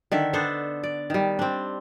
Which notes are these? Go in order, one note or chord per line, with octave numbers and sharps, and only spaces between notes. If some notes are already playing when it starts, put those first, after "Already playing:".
D3 D#3 E5
B3 D4 A4 C5
D5
D#3 G3
C4 D4